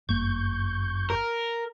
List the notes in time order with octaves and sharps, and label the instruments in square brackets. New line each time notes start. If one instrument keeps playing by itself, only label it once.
[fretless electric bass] G1 A#3 [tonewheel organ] F#2 C#6 G6
[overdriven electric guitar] A#4